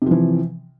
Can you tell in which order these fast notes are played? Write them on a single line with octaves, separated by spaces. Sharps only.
C3 F3 E3